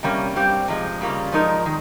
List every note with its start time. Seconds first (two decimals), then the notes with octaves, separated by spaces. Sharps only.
0.03 C3 G3 A#3 C#4
0.36 G2 G3 C4 G4
0.68 C3 F3 G#3
1.00 C#3 G3 A#3 F4
1.32 F3 G#3 D#4 A#4
1.65 D#3 G#3